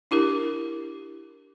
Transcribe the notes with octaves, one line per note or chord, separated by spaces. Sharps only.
D4 E4 G4 A#4